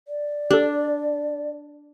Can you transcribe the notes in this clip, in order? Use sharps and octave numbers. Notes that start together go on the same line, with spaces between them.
D5
D4 G4 A4